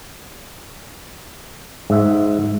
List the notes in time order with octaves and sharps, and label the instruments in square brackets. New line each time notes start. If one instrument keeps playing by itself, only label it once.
[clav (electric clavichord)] G#2 E5